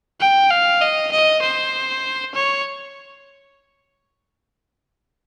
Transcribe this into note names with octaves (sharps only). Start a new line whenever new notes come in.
G5
F5
D#5
D#5
C5
C#5